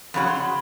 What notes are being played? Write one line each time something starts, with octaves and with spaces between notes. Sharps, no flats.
F2 C#3 F#3 B5
C6
B5